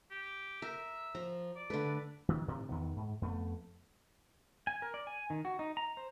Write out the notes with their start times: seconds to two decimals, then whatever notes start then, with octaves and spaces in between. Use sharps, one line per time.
0.11 G4
0.62 A#4 E5
1.15 F3 A#5
1.56 D5
1.70 D3 A3 B4
2.29 D#3 E3
2.48 A2 C3 D#3 E3
2.69 E2 D#3 B3
2.96 G#2
3.22 F2 A3 B3
4.67 G#5
4.82 A#4
4.94 D5
5.07 G#5
5.30 D#3
5.45 F#4
5.59 D#4
5.77 A#5
5.97 C5